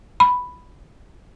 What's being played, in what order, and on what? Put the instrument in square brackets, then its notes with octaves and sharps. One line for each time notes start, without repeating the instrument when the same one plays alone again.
[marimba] B5